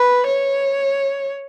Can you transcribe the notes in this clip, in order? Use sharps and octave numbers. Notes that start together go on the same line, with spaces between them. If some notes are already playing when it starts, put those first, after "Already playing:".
Already playing: B4
C#5